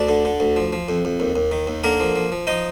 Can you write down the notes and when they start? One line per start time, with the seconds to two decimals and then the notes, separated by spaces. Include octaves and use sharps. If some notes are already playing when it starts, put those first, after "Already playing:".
Already playing: D2 D4 D5
0.09 D3
0.25 D3
0.40 D2
0.56 F3
0.73 F3
0.89 F2
1.05 F2
1.20 D#2
1.36 D#2
1.52 D#3
1.67 D#2
1.84 D3 A#3 A#4
2.00 F3
2.16 F3
2.32 F3
2.47 F3 D#4 D#5